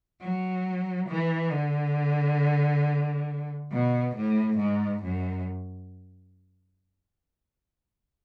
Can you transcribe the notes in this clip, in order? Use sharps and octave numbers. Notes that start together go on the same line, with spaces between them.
F#3
E3
D3
B2
A2
G#2
F#2